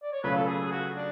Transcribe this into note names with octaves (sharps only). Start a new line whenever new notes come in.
D5
C#5
C#3 F#3 A3 F4 B4
A4
G#4
G#4
F#4
D4